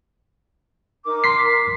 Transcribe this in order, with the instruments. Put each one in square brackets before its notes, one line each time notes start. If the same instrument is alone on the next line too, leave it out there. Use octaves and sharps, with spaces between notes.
[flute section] D#4 A#4 D6
[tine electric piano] C6 B6 C7